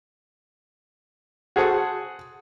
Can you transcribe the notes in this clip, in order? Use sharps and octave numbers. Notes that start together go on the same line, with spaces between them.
F#4 G#4 A4 C5 F#5